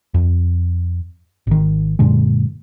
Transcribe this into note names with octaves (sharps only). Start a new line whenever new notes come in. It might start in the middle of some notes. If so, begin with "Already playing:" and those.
F2
G#1 D#3
F#2 A#2 D3 G#3